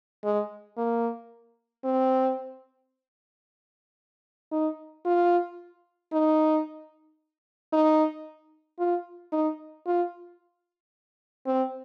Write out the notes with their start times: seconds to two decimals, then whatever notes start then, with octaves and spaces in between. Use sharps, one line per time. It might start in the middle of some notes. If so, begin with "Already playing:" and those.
0.24 G#3
0.77 A#3
1.84 C4
4.52 D#4
5.06 F4
6.13 D#4
7.73 D#4
8.79 F4
9.32 D#4
9.87 F4
11.46 C4